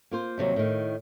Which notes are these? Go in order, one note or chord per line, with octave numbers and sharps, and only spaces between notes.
A#3 F4 C5
D#2 C3 E3 F#3 G3
A2 D#3